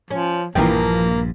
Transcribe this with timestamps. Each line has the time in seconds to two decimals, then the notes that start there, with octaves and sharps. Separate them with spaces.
0.11 F3 C#4
0.55 A#1 G2 E3 F3 A#3 F4 A#4 G5